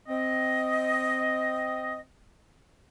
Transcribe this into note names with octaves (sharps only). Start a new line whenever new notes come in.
C4 D#5